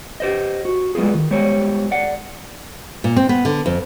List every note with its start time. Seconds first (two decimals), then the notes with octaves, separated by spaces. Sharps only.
0.20 G4 C5 D#5
0.65 F#4
0.95 G3 G#3 B3 F4 G#4
1.14 D#3
1.30 G3 G#3 B3 G4 C5 C#5
1.91 D5 F#5
3.04 A#2
3.16 C4
3.29 B3
3.45 D3
3.66 F2